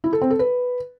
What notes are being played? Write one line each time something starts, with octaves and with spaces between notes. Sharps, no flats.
E4
A4
C4
A4
B4